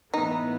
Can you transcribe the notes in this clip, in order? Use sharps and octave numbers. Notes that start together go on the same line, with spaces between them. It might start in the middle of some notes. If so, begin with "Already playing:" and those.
A2 E3 B3 D#4